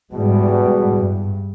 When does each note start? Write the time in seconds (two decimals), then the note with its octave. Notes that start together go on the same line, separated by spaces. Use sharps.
0.12 E2 G#2 B2 G3 G#3
0.93 G2